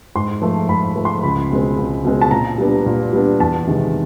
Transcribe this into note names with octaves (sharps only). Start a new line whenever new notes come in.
G#2 C6
F3 A3
G#2 B5
F3 A3
C6
C#2 B5
B2 G#3 C4
C#2
B2 G#3 C4
A5
A#2 A#5
G3 B3 D4
A#2
G3 B3 D4
E2 A5
C3 D#3 G#3